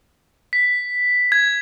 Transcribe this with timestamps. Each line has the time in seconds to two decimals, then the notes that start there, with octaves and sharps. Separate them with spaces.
0.53 B6
1.32 G#6